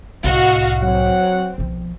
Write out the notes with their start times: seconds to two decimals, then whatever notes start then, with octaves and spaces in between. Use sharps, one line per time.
0.24 C2 A2 F#4 D#5 F5
0.82 F#3 C4 C#5 F#5
1.58 B1 F3